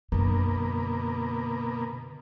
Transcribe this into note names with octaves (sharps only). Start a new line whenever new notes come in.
F#2 B2 D3 A#3